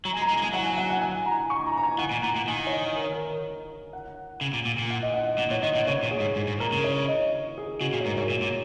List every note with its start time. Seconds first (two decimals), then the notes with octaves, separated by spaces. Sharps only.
0.05 F#3 A#5
0.13 G#5
0.17 G#3
0.22 A#5
0.29 G#3
0.37 A#3
0.42 G#3 G#5
0.53 F#3 F#5
0.66 G#5
0.78 F#5
0.90 F#5
1.01 G#5
1.26 A#5
1.50 C#6
1.66 A#5
1.77 A#5
1.83 G#5
1.98 D#3 F#5
2.11 A#2
2.23 A#2 A#5
2.36 A#2
2.48 D#3 G#5
2.67 C#5
2.72 D#5
2.96 A#4
3.04 C#5
3.12 A#4
3.93 F#5
4.41 C#3
4.53 A#2
4.65 A#2
4.78 A#2
4.90 F#5
5.03 D#5
5.14 F#5
5.27 D#5
5.38 A#2
5.50 A#2 C#5
5.63 D#3 D#5
5.75 A#2 F#5
5.87 C#3 C#5
6.03 A#2
6.11 G#4
6.20 G#2
6.36 G#2
6.47 G#2
6.60 A#2 A#4
6.72 C#3
6.84 C#5
7.08 D#5
7.58 G#4
7.81 C#3 F#4
7.93 A#2 G#4
8.01 C#5
8.05 G#2 A#4
8.17 G#2 C#5
8.30 A#2
8.42 A#2